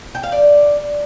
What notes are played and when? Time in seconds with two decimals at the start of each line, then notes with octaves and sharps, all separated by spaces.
0.15 G5
0.23 F5
0.32 D5